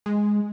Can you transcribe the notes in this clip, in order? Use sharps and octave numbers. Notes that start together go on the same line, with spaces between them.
G#3